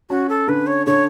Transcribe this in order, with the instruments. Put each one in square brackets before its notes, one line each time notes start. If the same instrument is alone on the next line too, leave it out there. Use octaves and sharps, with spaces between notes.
[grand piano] C#4 [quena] F#4
[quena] A4
[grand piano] D3 [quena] B4
[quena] C#5
[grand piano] D3 [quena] C#5